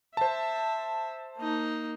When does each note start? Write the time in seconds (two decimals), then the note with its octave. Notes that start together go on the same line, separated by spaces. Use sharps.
0.17 C5 E5 A5
1.38 A#3 D#4